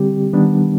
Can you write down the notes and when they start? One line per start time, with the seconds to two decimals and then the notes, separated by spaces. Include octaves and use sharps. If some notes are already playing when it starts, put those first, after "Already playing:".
Already playing: D3 G3 C4 G4
0.33 D#3 G3 B3 D4